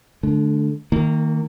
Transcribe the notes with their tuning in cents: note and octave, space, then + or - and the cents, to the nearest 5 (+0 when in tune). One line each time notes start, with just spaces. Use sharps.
D3 +0 A3 -35
D#3 +10 A#3 -30